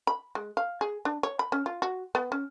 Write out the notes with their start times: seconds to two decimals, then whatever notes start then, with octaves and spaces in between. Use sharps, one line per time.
0.07 B5
0.35 G#3
0.57 F5
0.81 G#4
1.05 D4
1.23 C#5
1.39 B5
1.52 C#4
1.66 F4
1.82 F#4
2.15 B3
2.32 C#4